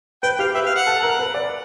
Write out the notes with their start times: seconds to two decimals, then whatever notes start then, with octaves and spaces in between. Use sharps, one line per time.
0.23 B4 G5
0.39 G4 F5
0.55 B4 E5
0.66 F5
0.76 F#5
0.87 A4
1.03 A#4
1.19 B4
1.34 D5